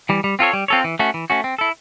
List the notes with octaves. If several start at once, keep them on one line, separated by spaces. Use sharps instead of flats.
E3 G3
G3
C4 F4 A4 C#5
G3
C4 F4 A4 C#5
E3
A3 C#4 F#4
E3
A3 C#4 F#4
C4
E4 A4